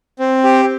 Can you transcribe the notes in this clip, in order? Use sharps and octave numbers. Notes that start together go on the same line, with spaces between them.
C4
G4